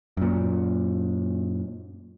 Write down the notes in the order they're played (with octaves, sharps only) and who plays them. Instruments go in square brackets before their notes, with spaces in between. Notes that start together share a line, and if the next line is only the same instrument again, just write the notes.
[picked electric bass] F#2 A#2